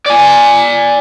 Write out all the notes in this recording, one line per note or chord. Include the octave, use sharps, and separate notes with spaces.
D5 G#5